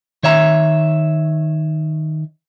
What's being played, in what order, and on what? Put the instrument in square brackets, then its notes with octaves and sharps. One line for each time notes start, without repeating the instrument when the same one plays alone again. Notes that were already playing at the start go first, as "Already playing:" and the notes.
[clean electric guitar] D#3 C#5 E5 A#5